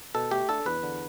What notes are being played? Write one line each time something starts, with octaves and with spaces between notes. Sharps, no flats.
B2 A4
A3 G4
D4 A4
E2 B4
D3